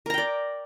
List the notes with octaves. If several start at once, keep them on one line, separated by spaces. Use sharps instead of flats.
A#4 D5 G5 A#5